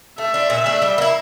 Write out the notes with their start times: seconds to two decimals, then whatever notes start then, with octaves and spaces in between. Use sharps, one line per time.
0.18 A3 E5
0.34 D4 F4
0.50 A#2
0.66 A3 D4 A4
0.82 G3
0.98 A#3 E4